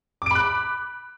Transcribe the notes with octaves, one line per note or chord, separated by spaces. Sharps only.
B5 D6 F#6 D7